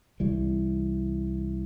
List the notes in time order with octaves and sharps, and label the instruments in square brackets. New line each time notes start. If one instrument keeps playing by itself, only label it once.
[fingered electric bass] C2 E3 G3